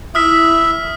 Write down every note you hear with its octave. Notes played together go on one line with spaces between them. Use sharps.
E4 E5 D#6 F6 B6